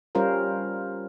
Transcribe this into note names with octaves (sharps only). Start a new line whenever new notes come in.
G3 C#4 F4 A#4 C5